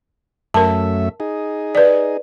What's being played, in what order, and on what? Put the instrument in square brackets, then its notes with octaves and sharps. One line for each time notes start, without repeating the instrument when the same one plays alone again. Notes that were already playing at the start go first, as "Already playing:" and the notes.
[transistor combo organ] F#2 A3 E5 [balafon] A#4 A5
[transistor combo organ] D#4 G#4
[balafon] B4 D5